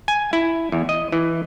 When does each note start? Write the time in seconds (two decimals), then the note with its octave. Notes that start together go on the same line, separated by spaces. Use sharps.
0.08 G#5
0.33 E4
0.72 E2
0.89 D#5
1.12 E3